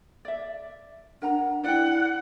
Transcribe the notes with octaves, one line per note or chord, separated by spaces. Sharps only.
D5 E5
D4 A#4 F#5 A#5
E4 D5 F#5 G5